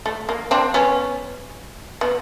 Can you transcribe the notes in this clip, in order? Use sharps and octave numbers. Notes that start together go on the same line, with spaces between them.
A3
A#3
C4 D4
B3 C#4
B3